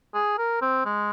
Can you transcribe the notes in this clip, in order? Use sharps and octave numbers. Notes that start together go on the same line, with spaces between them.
G#4
A#4
C4
G#3